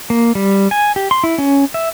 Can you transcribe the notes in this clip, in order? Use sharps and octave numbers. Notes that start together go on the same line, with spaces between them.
A#3
G3
G#5
G4
C6
E4
C#4
E5